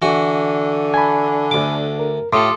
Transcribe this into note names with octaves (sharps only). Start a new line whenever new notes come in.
D3 E3 F#4
G#5 A5 B5
D2 D6
A#4
A2 F4 G4 A4 C6 D6 D#6